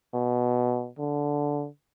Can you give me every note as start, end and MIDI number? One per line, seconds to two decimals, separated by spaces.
0.13 0.88 47
0.99 1.67 50